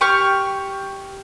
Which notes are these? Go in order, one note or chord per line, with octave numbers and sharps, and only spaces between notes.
G4 C#6 F6